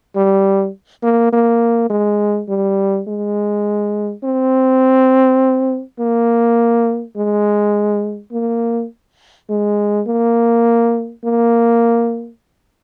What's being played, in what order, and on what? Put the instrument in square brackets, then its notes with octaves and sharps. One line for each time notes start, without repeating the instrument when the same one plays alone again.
[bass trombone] G3
A#3
A#3
G#3
G3
G#3
C4
A#3
G#3
A#3
G#3
A#3
A#3